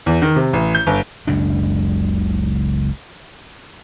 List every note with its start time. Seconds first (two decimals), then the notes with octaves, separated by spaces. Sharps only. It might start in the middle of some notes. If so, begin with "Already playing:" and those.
0.06 E2
0.22 D#3
0.36 C3
0.53 A1
0.75 G6
0.87 G1
1.27 F#1 C#2 F#2 D4